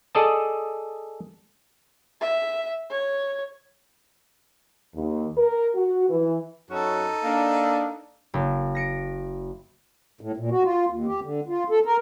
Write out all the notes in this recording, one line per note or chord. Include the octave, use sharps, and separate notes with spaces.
G#4 A4 D5 D#5 A5
E5
C#5
D#2
A#4
F#4
E3
F#2 C#4 D#4 F#4 A4
A#3 D4
F#1
A#6 C#7 D7
A2
A#2
F#4
F4
D#2
G4
D3
F4
A4
A#4